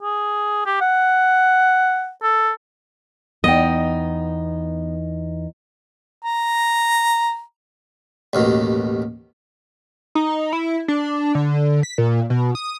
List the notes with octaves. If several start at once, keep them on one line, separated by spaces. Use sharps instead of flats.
G#4
G4
F#5
A4
E2 B3 D#4 D#5 G5
A#5
A1 D#2 B2
D#4
E4
D4
D3
B6
A#2
B2
D#6